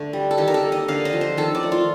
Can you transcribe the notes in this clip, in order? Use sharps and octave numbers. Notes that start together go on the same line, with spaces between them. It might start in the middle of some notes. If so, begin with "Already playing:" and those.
Already playing: D3 A3
G3
A4
D#3 G4
A#4
A4
A#3
D#5
D3 F5
D#5
F3
C5
D#3 A4
D5
A3
F4